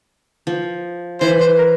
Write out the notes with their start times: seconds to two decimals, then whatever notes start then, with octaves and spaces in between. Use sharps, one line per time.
0.47 F3
1.21 E3 C5
1.40 C5
1.58 A#4